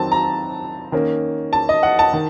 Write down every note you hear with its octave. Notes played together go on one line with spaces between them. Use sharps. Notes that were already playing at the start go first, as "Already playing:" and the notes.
Already playing: D#3 F#3 C4 A5
A#5
D#3 A#3 C#4
A5
D#5
F#5
A5
D#3